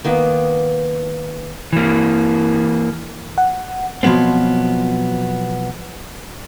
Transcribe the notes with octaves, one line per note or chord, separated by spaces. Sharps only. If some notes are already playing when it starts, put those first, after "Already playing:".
D#3 A#3 B3
E3 A#3
F#5
B2 F3 F#3 B3 C4